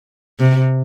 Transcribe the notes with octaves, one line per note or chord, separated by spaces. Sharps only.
C3